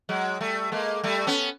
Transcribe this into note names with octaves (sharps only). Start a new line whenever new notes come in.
F#3 G#3
G3 A3
G#3 A#3
G3 A3
B3 C#4